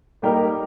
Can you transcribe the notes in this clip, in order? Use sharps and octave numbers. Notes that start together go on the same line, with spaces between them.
G3 A#3 D#4 G4 A#4